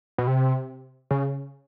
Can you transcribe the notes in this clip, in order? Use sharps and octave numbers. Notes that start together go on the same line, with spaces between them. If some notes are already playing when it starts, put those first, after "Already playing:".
B2
C3
C#3